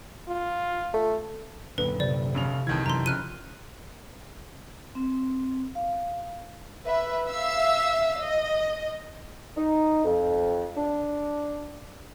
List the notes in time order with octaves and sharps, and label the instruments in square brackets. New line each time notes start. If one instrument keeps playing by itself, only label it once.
[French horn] F4
[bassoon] A3
[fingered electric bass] F#2 A#2 D3 [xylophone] B4
[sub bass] C3 [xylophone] C5 D5
[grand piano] F1 C#3 F7
[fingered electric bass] C2 E3 [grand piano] F2 D#3 G#6
[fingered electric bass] F#2 E3 [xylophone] A#5 C6
[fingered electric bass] C#3 F3 [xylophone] F6 F#6 D#7
[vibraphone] C4
F5
[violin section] B4 E5
E5 F5 E6
D#5
[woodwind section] D#4
F2
D4